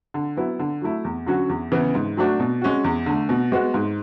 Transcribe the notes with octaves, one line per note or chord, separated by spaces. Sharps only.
D3
F#3 B3 E4
D3
F#3 A3 E4
E2
D3 F#3 C#4 F#4
E2
C#3 E3 B3
G#2
F#3 A3 D4 F#4
B2
G#3 C#4 F#4
E2
D3 A3
B2
G#3 B3 F#4
G#2